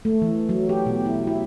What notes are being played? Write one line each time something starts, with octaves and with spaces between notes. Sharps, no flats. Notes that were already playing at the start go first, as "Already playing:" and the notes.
A3
E3
F#3
G4
B2
E4
E4